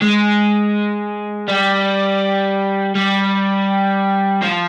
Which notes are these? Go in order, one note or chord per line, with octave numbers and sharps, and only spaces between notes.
G#3
G3
G3
F3